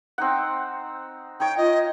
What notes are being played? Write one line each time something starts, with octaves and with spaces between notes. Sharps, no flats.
C4 D#4 F#5
D#4 C#5 G5
F4 D#5